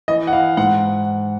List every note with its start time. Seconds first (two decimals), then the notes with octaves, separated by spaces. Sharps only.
0.08 E3 D#5
0.27 F#5
0.33 E3 F5
0.57 G#2 F#5